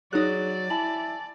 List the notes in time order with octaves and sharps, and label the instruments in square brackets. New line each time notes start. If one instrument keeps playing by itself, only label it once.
[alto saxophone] F#3 [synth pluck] D#4 F#6 [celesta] G#4 C#5 [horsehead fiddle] D5
[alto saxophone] E4 [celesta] G#5 A5 F#7